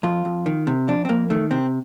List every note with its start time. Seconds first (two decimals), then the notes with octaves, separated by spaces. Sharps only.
0.03 F2 F4
0.25 F2
0.46 D#3
0.67 C3
0.88 F2 D4
1.05 C4
1.09 F2 A#3
1.30 D#3 A3
1.51 C3 C4